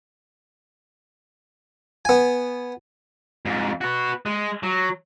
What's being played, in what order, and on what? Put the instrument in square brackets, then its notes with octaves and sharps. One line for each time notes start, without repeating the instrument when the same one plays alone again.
[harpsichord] B3 G#5
[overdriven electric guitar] F2 G#2
F#4 B4
G#3
F#3